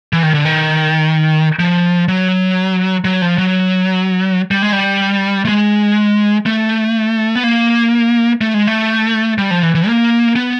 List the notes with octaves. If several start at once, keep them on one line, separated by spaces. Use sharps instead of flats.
E3
D#3
D3
D#3
F3
F#3
F#3
F3
F#3
G3
G#3
G3
A3
G#3
A3
B3
A#3
A3
G#3
A3
G3
F3
E3
E3
A#3
B3